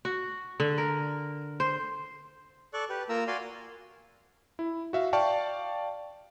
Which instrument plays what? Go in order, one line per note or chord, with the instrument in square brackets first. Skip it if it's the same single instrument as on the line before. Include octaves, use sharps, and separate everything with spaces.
[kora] F#4
D3
A#4
C5
[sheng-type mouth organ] A4 D5 C#6 F#6
G4 B4
A#3 F4 A#4 A#5 E6
F#4 D5 F5 G#5 C6
[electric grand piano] E4
F#4 E5 F5
D5 F5 G5 A5 C#6